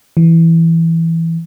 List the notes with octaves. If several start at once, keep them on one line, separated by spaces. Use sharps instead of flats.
E3